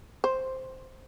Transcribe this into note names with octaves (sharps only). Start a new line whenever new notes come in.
C5